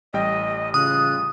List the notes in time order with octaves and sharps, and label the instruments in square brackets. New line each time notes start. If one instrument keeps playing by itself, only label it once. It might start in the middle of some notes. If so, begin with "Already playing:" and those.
[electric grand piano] A1 G3 G5 [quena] D#5
[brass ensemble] C#3 F4 [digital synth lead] D#6 [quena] F#6